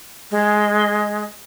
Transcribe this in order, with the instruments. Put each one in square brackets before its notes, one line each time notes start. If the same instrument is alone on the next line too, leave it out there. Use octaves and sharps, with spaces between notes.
[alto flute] G#3